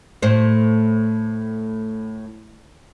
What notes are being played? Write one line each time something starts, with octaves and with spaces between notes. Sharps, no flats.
A2 C5